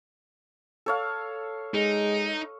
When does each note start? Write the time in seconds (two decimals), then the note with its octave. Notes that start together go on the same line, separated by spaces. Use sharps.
0.86 A4 C#5 F5
1.74 G#3 D#4